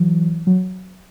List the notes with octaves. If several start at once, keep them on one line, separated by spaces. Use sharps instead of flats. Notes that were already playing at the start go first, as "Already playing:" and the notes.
Already playing: E3 F#3
F#3